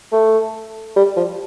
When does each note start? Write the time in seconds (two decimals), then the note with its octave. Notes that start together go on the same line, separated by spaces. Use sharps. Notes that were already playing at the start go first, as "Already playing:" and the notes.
0.12 A3
0.96 G3
1.17 F3